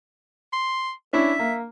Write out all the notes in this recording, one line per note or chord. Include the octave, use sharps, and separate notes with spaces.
C6
C#4 D4 E4 E5
A#3